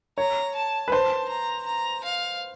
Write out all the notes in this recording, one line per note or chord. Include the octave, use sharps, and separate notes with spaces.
C#5 A#5
A5
B4
C5 A5
A#5
A#5
F5